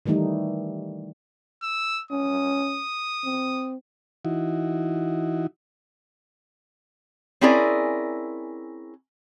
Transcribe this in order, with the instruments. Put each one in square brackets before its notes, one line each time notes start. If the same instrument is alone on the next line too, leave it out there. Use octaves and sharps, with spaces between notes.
[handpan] D#3 E3 G3 A3 D#4
[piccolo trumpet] E6
[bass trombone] C#4 [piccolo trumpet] D#6
[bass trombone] C4
[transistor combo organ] E3 D#4 E4 F#4
[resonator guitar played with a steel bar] C4 C#4 E4 G#4 A#4 D5